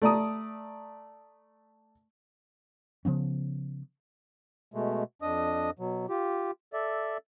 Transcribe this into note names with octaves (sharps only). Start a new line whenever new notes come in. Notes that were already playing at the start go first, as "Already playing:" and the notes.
A3 D5 A#5 D#6
C#3 F3 B3 C#4
B2 G#3 A3
F2 D4 D#5 D#6
B2 F#3
F4 G4
A4 D5 E5